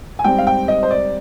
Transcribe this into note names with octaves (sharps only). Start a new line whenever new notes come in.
G#5
G#2 G3 C4 G5
F5
G5
D#5
C5
D5